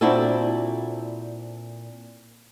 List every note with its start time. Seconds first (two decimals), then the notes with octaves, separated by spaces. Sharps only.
0.01 A#2 C4 D4 E4 F#4 A4